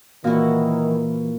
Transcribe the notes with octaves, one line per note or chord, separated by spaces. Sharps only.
A#2 D#3 E3 E4 F#4